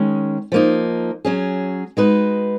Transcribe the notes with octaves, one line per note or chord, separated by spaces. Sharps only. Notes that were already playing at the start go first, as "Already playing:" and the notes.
Already playing: D#3 G#3 C#4
F3 A#3 D#4
F#3 C#4 G#4
G#3 D#4 F#4 B4